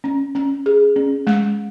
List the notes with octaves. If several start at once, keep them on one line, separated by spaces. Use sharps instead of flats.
C#4
C#4
G#4
C#4
G#3